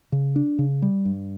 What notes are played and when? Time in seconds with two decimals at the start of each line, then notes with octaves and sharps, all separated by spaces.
0.12 C#3
0.36 D4
0.59 C#3
0.82 G3
1.05 G2